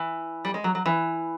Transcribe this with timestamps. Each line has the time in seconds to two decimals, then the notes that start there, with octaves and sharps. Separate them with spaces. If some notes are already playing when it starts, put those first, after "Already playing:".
Already playing: E3
0.45 G3
0.54 G#3
0.64 F#3
0.75 F#3
0.86 E3